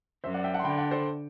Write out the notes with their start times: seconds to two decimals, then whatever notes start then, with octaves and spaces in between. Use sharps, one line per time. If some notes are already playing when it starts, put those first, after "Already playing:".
0.24 F#2 C5 E5
0.34 D5 F#5
0.44 E5 G5
0.54 F#5 A5
0.60 C6
0.64 D3 G5 B5
0.78 F#5 A5
0.91 A4 C5